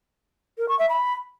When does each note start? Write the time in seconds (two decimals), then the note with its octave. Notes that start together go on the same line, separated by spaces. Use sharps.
0.58 A#4
0.69 C#6
0.79 E5
0.89 B5